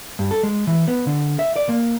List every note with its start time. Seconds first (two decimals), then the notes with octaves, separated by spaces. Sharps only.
0.19 G2
0.31 A4
0.43 G#3
0.67 E3
0.88 B3
1.07 D3
1.39 E5
1.56 D5
1.69 A#3